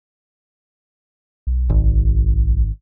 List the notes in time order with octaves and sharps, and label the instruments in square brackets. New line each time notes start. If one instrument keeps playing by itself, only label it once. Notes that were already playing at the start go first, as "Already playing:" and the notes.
[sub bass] B1
[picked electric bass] G#1